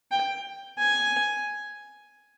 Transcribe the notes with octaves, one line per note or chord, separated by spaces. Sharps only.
G5
G#5